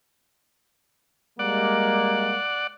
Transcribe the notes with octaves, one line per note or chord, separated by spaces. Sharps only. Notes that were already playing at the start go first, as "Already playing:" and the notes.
G3 G#3 A#3 D5 F#5